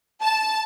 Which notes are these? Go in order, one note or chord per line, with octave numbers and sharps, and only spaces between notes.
A5